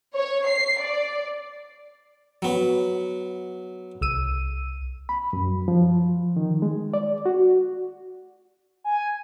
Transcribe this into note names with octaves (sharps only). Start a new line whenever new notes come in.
C#5
C7
D5
F#3 B3
C2 E6 D#7
B5
F#2
F3
D#3
G#3
D5
F#4
G#5